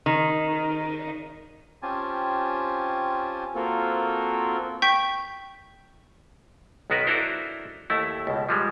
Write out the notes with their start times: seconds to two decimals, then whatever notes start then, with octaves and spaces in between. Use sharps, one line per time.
0.06 D#3
1.82 C4 C#4 F4 G4 G#5 A5
3.55 A#3 C4 F4 F#4 A4 A#4
4.82 G5 C#6 G6 B6
6.90 B1 D#3 B3 F#4 A#4 B4
7.07 D4 E4 F#4 A4 A#4 C5
7.90 D#2 A3 E4
8.27 C#2 B2
8.49 F3 G3 G#3